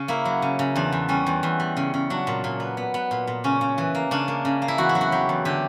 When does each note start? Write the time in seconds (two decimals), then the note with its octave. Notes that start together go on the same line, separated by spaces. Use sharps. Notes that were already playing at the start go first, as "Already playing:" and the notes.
Already playing: C#3
0.08 A#3 E4
0.25 F#3
0.42 C#3
0.59 C#3
0.76 E2 D4
0.92 E2
1.09 G3 C#4
1.27 E2
1.43 E2
1.60 G3
1.77 C#3
1.94 C#3
2.10 F#3 D4
2.27 A#2
2.44 A#2
2.60 B3
2.77 B3
2.94 B3
3.11 A#2
3.27 A#2
3.44 C#3 C#4
3.61 C#3
3.78 E3
3.95 A#3
4.11 C#3 D4
4.28 A#3
4.45 C#3
4.62 A#3
4.68 E4
4.78 E2 F#4
4.89 E4
4.95 F#3
5.01 F#4
5.12 F#3 G4
5.29 E2
5.45 D3 G4